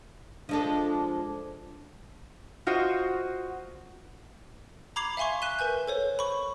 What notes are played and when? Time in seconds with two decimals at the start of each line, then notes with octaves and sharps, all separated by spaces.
0.49 F3 G#3 D4 A4
2.67 F4 F#4 C5 D#5
4.96 A#5 B5 D6 G#6 C7 F7
5.17 E5 F5 G#5 C6 C#6
5.42 F#6 B6 D#7 E7 G7
5.59 A#4 B4 G#5 G6
5.88 A4 C5 C#5
6.19 B5 C#6